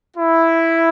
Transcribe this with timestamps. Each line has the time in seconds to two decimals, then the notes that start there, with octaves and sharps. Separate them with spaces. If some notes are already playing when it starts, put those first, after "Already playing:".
0.17 E4